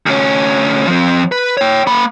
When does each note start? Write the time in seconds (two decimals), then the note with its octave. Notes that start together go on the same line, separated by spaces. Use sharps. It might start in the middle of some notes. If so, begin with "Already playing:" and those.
0.06 D2 C#4
0.87 F3 C4
1.32 B4
1.57 C#5 G5
1.87 A#3 B5